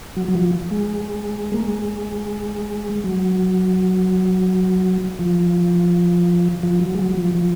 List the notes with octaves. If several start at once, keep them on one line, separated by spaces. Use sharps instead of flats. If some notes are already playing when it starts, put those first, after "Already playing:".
F#3
F#3
F3
G#3
A#3
G#3
F#3
F3
F3
F#3
G#3
F#3
F3
F3